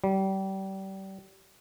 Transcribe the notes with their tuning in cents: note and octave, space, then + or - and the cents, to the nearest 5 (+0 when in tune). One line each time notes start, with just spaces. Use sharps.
G3 -30